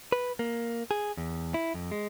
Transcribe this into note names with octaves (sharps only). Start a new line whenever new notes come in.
B4
A#3
G#4
E2
E4
F2
G#3